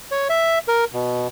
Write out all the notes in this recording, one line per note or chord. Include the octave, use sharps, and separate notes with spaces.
C#5
E5
A#4
B2